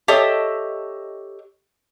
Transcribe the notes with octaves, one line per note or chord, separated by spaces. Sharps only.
G4 A4 C#5 D#5 E5